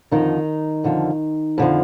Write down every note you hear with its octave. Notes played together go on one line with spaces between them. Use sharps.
F2 D3 D#3 F3 D#4
F2 D3 F3
F2 D3 F3